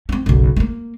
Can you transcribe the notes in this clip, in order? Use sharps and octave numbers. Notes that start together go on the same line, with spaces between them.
C4 C#4
F#1 B1
A3 A#3